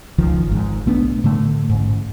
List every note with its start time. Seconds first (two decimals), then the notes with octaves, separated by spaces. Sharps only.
0.18 C#2 D#3 F3
0.47 G#1 G#2
0.86 B1 A3 B3 D4
1.24 A2 D3 A3
1.69 A1 G#2